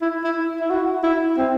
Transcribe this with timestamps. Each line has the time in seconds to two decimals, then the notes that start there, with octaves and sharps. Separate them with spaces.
0.02 E4
0.24 E4
0.60 E4
0.70 F#4
1.03 E4
1.37 C4